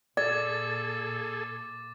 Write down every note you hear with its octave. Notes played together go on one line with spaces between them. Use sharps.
A#2 G#4 A4 D5 D6 A6